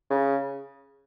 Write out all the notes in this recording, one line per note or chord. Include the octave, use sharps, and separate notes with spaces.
C#3